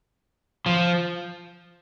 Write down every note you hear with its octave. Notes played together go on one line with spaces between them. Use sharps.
F3